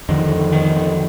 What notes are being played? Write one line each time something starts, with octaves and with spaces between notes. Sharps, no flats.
F2 D3 D#3
D#3